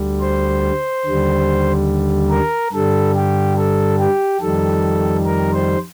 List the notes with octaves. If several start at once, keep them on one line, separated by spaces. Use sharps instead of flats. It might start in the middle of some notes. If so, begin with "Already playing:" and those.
Already playing: D2 D3 G3
C5
D#2 D3 G3
A#4
G2 D3 G3 A4
G4
A4
G4
F2 D#3 G3 A4
A#4
C5